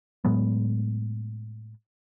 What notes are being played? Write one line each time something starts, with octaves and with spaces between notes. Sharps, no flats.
A2 F#3 G#3 B3